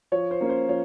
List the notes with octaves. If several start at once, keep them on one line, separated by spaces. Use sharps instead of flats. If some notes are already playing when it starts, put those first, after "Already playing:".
F3 C#5
C5
A#3 C#4
C5
F3 C#5